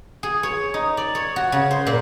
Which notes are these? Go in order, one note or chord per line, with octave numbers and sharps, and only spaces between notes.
G#4
C#5
D#4
D5
C#5
F#4
C#3
C5
A#2